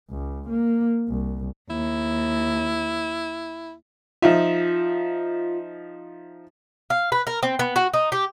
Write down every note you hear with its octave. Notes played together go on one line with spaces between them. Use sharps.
C#2
A#3
C2
D#2 E4
F3 D#4 F4 E5
F5
B4
A#4
C4
B3
F#4
D#4
G4